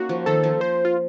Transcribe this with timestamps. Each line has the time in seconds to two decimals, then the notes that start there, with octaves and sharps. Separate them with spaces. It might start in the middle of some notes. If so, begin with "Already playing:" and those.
Already playing: A#3 C#4 D#4 F#4
0.09 F3
0.26 D#3 A4
0.43 F3
0.61 C5
0.85 F4